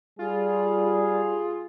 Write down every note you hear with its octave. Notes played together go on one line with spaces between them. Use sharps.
G3 F4 G#4